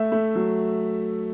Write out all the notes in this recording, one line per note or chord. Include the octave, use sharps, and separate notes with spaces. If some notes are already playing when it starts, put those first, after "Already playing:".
Already playing: A3 E5
A3
F#3